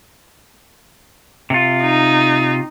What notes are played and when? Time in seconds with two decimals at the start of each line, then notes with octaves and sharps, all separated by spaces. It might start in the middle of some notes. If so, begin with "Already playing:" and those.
1.50 C3 F4
1.83 D#4